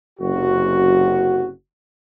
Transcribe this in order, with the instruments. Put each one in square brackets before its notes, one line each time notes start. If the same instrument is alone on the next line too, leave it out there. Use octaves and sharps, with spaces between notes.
[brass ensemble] F#1 F#2 C3 F#4